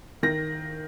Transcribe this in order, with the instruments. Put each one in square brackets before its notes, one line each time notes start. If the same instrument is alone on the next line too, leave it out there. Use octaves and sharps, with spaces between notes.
[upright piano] D#3 A#6